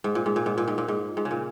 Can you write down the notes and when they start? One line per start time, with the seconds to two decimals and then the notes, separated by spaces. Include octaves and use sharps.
0.04 G#2
0.15 A#2
0.26 G#2
0.36 A#2
0.46 G#2
0.58 A#2
0.68 G#2
0.78 A#2
0.88 G#2
1.17 G#2
1.25 C#3
1.31 A#2